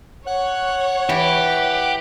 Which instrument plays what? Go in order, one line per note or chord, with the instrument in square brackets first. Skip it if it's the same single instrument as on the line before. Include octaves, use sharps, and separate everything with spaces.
[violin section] C#5 [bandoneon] F#5 F#6
[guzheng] E3 [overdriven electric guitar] G4